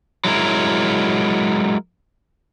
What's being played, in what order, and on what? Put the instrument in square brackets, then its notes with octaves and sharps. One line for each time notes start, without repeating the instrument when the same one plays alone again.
[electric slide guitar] F#3 G#3 E4 A#4